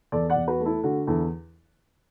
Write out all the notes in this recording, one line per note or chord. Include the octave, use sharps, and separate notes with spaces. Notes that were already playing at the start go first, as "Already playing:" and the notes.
E2 A4 D5
D5 F#5
E2
F#4 B4
A3
E4 A4
D3 F#4
E2 E4 A4